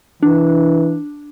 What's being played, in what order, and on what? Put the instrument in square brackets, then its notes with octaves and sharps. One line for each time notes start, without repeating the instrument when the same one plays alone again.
[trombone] E3 [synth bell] D4